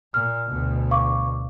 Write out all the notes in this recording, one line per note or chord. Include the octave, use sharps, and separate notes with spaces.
A#2 F6
D2 B2
F5 C#6 D6